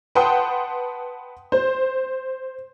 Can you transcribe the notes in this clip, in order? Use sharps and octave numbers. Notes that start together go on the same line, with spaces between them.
B4 F#5 G5 A5 C6 D#6
C5